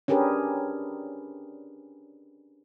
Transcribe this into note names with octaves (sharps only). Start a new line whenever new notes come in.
C#4 D4 G4 G#4 A#4 B4